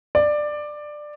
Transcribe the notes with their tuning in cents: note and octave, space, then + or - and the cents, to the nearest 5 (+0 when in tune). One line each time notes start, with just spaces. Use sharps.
D5 +15